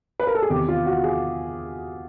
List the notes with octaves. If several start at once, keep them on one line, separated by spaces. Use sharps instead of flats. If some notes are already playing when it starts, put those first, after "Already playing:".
B4
A#4
A4
G#4
E2 C3 D#3 G4
F4
F#4
G#4